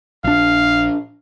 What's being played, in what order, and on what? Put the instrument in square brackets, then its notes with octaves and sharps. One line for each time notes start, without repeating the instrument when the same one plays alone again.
[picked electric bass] A#1 D4 [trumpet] F5